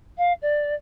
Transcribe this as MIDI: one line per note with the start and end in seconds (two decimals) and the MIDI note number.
0.17 0.32 77
0.41 0.74 74